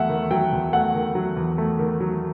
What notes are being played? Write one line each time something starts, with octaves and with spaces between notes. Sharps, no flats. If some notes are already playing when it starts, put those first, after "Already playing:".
Already playing: E2 F#3 A3 E5 F#5
D#3
F#3 G5
E2
A3 F#5
D#3
F#3
E2
A3
D#3
F#3